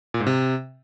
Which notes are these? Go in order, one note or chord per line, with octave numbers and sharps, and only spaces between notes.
A#2
G#2
C3